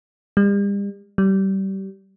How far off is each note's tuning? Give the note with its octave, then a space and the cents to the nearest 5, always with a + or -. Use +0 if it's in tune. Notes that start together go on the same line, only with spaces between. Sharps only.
G3 +40
G3 -25